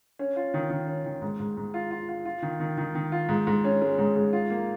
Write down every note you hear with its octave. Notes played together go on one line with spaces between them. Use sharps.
C#4
F4
D#3
D#3
C#4
D#3
G#2
G#2
G#2
F4
F4
F4
F4
D#3
D#3
D#3
D#3
F4
G#2
G#2
C#4
G#3
G#2
G#2
F4
A#3